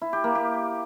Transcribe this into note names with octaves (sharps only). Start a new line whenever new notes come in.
E4
G4
A#3
G4